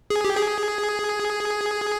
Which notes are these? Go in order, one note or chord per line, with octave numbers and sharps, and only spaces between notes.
G#4
G4
G#4